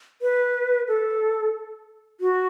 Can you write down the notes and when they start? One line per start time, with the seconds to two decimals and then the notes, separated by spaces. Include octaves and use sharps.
0.22 B4
0.88 A4
2.21 F#4